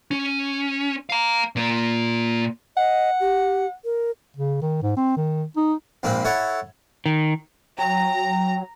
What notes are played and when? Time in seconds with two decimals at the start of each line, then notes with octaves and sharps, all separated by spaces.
0.11 C#4
1.10 F5 A#5
1.56 A#2 A#3
2.77 D#5 F#5
3.20 G4
3.85 A#4
4.37 C#3
4.62 D#3
4.82 G#2
4.97 C4
5.17 D#3
5.56 D#4
6.03 A#1 G#2 A#3 C4 B5
6.25 E4 A4 C#5 F#5
7.06 D#3
7.78 F#3 G5 A#5